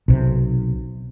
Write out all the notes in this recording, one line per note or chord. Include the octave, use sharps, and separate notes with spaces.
B1 C3